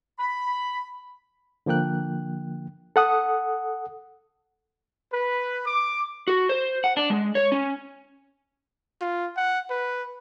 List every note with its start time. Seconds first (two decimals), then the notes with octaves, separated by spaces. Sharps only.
0.19 B5
1.66 D3 F3 A#3 G5 F#6
2.96 A4 F#5 D#6
5.12 B4
5.67 D6
6.28 F#4
6.49 C5
6.84 F#5
6.97 D4
7.10 G#3
7.35 C#5
7.52 C#4
9.01 F4
9.37 F#5
9.70 B4